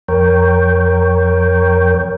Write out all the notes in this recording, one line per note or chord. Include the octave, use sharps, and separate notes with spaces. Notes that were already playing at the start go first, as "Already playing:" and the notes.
F2 A#4 C#5 G5